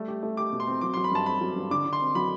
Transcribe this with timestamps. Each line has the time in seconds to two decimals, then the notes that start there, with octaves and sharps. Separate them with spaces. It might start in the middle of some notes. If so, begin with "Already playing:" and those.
Already playing: G3 A3
0.08 G4
0.23 A3
0.37 G4 D6
0.52 B2
0.60 C6
0.67 C4
0.81 F#3 D6
0.94 F#3 C6
1.04 B5
1.12 G2 A5
1.26 C4 B5
1.41 F#3
1.56 G2
1.71 D3 D6
1.85 D3
1.93 C6
2.00 C4
2.15 F#3 B5